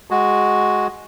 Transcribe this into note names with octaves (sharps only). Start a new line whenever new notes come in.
G#3 F#4